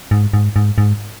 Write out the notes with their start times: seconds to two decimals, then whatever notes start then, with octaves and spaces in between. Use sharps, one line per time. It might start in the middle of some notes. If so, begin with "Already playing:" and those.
0.11 G#2
0.33 G#2
0.56 G#2
0.78 G#2